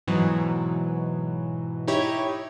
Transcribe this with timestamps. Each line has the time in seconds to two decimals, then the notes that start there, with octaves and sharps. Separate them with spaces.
0.07 G#2 B2 E3 F#3
1.88 D#4 E4 G4 C#5